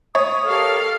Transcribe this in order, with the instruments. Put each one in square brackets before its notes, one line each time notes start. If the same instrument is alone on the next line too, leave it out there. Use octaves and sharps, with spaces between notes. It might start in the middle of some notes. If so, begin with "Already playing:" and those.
[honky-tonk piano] C#5 [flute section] D#6
[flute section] G4 A#4 [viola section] A4 F5